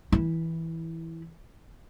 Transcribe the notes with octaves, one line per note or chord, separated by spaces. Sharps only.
E3 E4